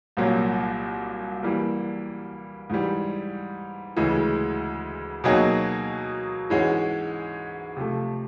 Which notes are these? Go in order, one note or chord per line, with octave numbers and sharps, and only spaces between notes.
C2 A#2 F#3 A#3
E3 G3 A#3
G#2 E3 G3
D2 C#3 E3 G#3
B2 F#3 A#3 D#4 G#4
G#2 E3 G#3 C#4 F#4
C3 F3 A3